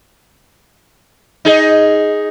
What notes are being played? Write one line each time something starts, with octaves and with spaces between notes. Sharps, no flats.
D#4 G#4